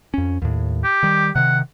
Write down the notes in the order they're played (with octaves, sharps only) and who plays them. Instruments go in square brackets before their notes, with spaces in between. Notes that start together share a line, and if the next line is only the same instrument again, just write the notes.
[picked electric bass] F2 C#4
D#2 A2
[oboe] G4
[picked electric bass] D#3 G3
[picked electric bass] C3 D#3 [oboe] F#5